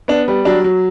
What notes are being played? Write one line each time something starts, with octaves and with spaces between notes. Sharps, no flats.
B3 D4
G3
F#3 D4
F#3